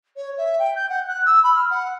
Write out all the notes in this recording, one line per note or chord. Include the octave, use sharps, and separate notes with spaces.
C#5
E5
G5
G6
F#5
F#6
E6
B5
F6
F#5